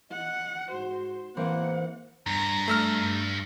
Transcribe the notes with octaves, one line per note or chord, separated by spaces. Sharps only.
D#5 F#5
G#2 F#4 C5
A1 G#2 E3 A#3 C4 F#5
G2 A#5
A3 E6 F6